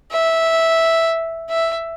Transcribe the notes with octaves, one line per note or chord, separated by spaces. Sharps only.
E5
E5